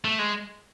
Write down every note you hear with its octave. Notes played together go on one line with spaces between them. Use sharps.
A3
G#3